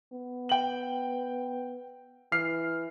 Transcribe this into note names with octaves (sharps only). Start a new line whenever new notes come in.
B3
G5 F#7
E3 F6 C7